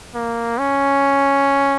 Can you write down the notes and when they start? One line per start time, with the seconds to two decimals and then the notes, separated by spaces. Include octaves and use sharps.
0.15 A#3
0.59 C#4